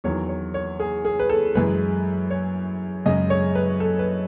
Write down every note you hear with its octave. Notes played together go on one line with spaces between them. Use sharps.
E2 D#3 F#3 C#5
C#5
C#5
G#4
G#4
B4
A4
F#2 E3 G#3 B4
C#5
F#2 C#3 G#3 D#5
C#5
B4
A4
B4